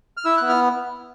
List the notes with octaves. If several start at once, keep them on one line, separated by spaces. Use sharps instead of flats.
F6
E4 E6
B3 F#6
F6